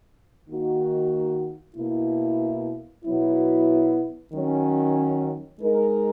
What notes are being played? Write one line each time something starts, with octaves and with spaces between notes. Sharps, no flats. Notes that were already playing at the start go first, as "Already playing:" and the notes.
D#3 A#3 D#4 F#4
B2 A#3 E4
B2 F#3 B3 E4
D#3 F#3 C#4
G#3 D#4 A#4